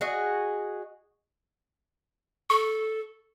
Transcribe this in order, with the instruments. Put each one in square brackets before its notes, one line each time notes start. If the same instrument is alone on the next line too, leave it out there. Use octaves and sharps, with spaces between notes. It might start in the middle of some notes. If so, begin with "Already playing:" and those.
[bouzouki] F#4 G#4 D#5
[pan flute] A4 [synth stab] C#6